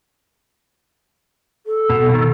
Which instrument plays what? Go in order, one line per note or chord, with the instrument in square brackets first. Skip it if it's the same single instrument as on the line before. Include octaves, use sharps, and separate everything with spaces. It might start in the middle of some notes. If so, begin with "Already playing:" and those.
[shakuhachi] A4
[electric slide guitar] B2
B2 D#3